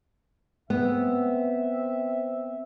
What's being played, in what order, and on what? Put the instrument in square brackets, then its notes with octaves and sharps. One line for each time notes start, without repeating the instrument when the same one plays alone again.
[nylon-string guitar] B3 [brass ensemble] C4 E5